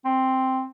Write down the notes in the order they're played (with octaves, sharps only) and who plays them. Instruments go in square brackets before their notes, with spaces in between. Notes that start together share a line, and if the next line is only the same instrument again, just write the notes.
[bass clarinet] C4